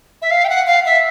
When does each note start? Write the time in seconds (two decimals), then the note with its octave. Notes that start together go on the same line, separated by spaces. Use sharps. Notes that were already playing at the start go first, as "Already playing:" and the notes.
0.22 E5
0.31 F5
0.45 G5
0.49 F#5
0.67 F5
0.86 E5